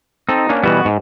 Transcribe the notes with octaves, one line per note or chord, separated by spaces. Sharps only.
C4 D#4 A4
A#3 C#4 D4
B2 E3 G3 B3 F#4
G#2